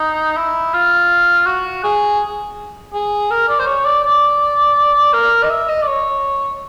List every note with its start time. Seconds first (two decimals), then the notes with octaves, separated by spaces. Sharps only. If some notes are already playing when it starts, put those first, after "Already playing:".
Already playing: D#4
0.37 E4
0.74 F4
1.46 F#4
1.84 G#4
2.93 G#4
3.31 A#4
3.48 D5
3.59 C5
3.66 C#5
3.85 D5
4.04 D5
5.13 A#4
5.44 D#5
5.50 E5
5.69 D#5
5.82 D5
5.87 C#5